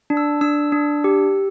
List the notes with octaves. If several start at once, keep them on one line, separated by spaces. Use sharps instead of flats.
D4
E6
D4 E6
D4
G4